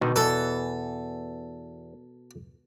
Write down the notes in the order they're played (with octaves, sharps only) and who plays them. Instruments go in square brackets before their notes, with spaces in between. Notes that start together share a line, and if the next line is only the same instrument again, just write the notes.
[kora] B2 [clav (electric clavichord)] D3 D#3 D#4
[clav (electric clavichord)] E2 E3 [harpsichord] A4